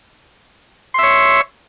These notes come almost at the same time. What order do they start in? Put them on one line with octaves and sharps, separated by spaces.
C6 E5 C#5